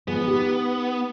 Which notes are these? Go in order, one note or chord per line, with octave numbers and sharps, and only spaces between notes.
F3 G#3 B3
D#4 G4